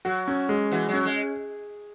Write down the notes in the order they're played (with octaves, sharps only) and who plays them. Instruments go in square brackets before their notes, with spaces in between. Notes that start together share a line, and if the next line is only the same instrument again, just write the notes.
[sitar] F#3 [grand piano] F#4
[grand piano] C#4
G#3
[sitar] E3 [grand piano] F#4
[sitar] F#3 [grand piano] C#4
[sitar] G#3